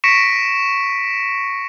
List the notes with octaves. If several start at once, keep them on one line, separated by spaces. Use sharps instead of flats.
C#6 A#6 B6 C#7 D7 E7